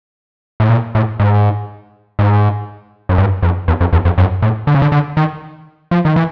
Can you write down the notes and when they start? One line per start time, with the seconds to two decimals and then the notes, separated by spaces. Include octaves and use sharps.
0.60 A2
0.70 A#2
0.95 A2
1.20 G#2
2.19 G#2
3.09 F#2
3.18 G2
3.43 F2
3.68 E2
3.81 F2
3.93 E2
4.05 F2
4.18 F#2
4.42 A2
4.67 D3
4.74 C#3
4.82 D3
4.92 D3
5.17 D#3
5.91 F3
6.05 D#3
6.16 E3